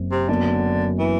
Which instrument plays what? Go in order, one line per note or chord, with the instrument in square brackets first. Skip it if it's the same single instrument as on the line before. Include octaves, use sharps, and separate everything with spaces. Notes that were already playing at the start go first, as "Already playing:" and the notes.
Already playing: [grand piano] F#1 F#2 C4
[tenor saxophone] C3
[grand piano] F#1 F#2 F#3 B3 F#4 [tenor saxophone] D3
[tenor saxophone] E3